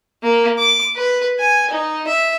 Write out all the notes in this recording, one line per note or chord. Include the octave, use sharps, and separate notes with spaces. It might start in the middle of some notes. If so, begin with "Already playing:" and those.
A#3
D6
B4
G#5
D#4
E5